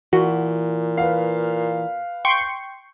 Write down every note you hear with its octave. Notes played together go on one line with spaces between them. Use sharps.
A#2 E3 F#4
B4 F5
G5 C6 C#6